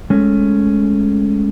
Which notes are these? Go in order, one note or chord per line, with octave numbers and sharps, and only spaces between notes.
G#3 A3 C#4